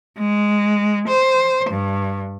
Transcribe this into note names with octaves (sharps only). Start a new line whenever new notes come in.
G#3
C5
G2